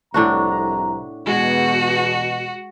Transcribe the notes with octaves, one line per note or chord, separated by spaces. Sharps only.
C2 F2 A2 D4 F#4 A#5
E2 B2 G#3 F#4